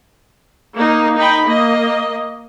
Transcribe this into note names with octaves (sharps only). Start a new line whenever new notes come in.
A#3 D#4
D#4 G5 B5
A#3 D#5